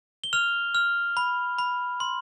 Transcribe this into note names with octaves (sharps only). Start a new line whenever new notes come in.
G7
F6 F7
F6
B5
B5
C6